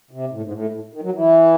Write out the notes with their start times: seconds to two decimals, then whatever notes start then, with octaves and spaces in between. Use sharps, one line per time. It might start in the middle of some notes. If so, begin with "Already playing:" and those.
0.11 C3
0.32 A2
0.43 G#2
0.52 A2
0.73 A2
0.94 D#3
1.03 F#3
1.13 E3